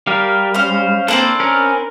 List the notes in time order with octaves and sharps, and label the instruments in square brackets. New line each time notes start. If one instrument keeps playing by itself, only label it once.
[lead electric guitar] G3 [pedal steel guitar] G4 A#4 F5
[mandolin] C#4 F5 [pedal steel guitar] C5
[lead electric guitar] A#3 A4 [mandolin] C4 D4 B4
[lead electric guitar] C#4 [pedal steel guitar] A#4